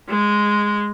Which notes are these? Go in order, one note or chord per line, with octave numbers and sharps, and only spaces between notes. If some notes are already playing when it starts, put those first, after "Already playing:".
G#3